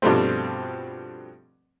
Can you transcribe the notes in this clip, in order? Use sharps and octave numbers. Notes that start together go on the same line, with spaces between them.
G2 B2 F3 G3 A3 C4